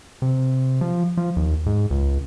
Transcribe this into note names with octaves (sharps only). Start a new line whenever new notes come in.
C3
F3
F3
D#2
G#2
C#2